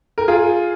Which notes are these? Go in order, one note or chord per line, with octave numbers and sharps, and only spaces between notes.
A#4
F4 G#4